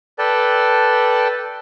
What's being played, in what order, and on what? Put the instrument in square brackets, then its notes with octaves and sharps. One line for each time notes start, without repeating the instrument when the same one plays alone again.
[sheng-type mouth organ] A4 B4 D5 G5 A5